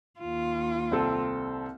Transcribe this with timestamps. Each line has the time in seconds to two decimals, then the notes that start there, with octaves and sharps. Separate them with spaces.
0.20 D#2 F4
0.91 C2 C4 A4